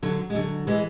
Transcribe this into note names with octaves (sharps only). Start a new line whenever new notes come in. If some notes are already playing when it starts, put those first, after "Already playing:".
D3 F#3
G#3
D3 F#3
E3 G#3